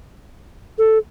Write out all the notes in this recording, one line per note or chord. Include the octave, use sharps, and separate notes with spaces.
A4